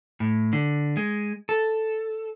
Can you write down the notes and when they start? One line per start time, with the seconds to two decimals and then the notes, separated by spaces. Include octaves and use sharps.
0.20 A2
0.53 D3
0.97 G#3
1.49 A4